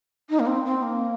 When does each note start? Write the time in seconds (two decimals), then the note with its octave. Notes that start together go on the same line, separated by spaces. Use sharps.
0.30 D#4
0.40 A#3
0.47 C4
0.65 C4
0.82 A#3